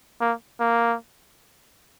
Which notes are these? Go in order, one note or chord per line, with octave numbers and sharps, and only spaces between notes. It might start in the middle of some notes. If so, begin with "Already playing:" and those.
A#3
A#3